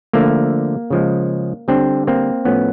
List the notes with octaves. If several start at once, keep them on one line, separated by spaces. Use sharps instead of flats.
D3 F3 A3 A#3
C#3 F3 G#3
D3 G3 C4 D4
A#3 C4
A2 F3 A3 B3 C#4